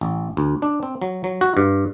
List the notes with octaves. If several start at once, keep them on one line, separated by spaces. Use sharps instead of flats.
A1
D2
D4
C4
F#3
F#3
F#4
G2